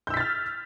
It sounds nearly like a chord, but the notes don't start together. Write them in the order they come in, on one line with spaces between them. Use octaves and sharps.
G6 E6 B6 A6 F6